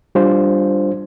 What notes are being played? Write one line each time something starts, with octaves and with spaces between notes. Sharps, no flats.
G3 D4 F4 C5